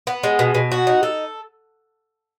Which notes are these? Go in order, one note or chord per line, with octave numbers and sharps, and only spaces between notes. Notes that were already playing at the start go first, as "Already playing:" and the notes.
B3
G#3
B2
B2
F#4
D#4
A4